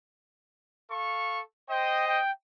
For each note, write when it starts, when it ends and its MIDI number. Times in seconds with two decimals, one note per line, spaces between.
0.89 1.40 69
0.89 1.40 77
0.89 1.40 85
1.70 2.20 72
1.70 2.20 75
1.70 2.03 79
2.08 2.31 79